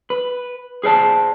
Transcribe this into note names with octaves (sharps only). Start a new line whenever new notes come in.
B4
G#4 C5 D5 A5